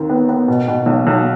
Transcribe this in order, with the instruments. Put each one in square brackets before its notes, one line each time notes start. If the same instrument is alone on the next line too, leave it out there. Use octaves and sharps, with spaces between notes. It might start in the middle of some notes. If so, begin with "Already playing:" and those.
Already playing: [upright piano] D#2 D#3 C4
B3
B3
B2
B2
B1
B1